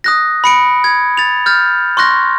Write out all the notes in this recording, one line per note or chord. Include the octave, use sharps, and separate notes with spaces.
D#6 F#6 A#6
B5 C#7 D7
G#6
A6 F7
F6 G6 A6
C6 C#6 F#6 A#6